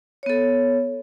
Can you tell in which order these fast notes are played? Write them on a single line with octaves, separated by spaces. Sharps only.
C#5 B3 A4